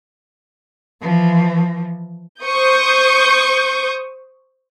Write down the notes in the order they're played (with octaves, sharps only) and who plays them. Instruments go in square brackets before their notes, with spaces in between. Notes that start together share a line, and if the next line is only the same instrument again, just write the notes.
[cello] E3 F3
[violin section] C5 C#6 D#6 G6